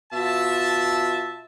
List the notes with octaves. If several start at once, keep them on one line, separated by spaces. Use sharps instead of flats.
B2 F4 E5 A5